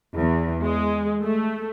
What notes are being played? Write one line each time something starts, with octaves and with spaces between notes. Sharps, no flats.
E2
G#3
A3